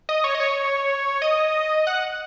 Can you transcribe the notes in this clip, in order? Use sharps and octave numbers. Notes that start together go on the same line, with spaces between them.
D#5
C#5
D#5
C#5
D#5
F#5